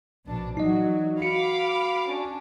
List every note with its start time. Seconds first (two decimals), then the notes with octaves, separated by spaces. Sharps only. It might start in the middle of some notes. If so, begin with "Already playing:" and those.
0.25 A#1 B2 D4
0.57 E3 F#3 D#4 F#4 D5 D#5
1.22 F#4 F5 B5 D6 C#7
2.09 C#4 D4